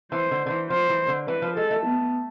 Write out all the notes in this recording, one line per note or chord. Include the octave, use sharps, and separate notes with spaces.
E3 C5
D3
D3
E3
F3 C5
E3
D3
E3 B4
F3
G#3 A4
A3
B3